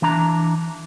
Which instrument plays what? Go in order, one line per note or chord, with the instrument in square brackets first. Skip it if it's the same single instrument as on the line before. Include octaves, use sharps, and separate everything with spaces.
[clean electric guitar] E3 D4 A#5